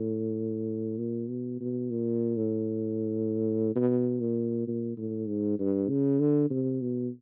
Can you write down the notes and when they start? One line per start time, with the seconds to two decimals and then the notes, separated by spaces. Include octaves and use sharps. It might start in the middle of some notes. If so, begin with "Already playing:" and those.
Already playing: A2
0.98 A#2
1.29 B2
1.60 B2
1.90 A#2
2.37 A2
3.75 B2
4.20 A#2
4.67 A#2
4.97 A2
5.28 G#2
5.59 G2
5.89 C#3
6.20 D3
6.50 C3
6.81 B2